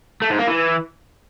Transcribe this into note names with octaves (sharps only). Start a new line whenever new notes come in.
A3
G#2
A#3
E3